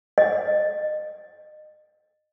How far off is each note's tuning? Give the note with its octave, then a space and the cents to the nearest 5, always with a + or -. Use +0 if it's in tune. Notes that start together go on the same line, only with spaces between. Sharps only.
D#5 -30